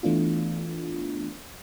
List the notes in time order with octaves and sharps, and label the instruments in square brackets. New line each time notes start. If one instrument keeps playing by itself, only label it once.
[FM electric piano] E3 A3 B3 D4 F4